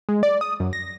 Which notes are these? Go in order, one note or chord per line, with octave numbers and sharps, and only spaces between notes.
G#3
D5
D#6
F#2
A#6